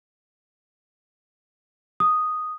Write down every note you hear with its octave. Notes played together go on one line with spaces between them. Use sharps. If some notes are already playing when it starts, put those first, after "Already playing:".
D#6